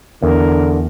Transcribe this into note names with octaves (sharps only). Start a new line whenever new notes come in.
E2 D3 A#4